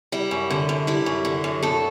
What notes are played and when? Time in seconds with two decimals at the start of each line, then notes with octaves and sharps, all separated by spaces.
0.12 G3 E4
0.31 F#2
0.50 D3
0.69 F#2
0.87 G3 E4
1.06 F#2
1.25 D3
1.44 F#2
1.63 B2 A4